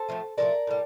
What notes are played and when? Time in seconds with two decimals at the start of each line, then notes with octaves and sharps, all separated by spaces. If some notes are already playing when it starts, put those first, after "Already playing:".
Already playing: A4 C5
0.08 A2 F3 A3
0.38 A2 F3 A3 A#4 D5
0.67 A2 G3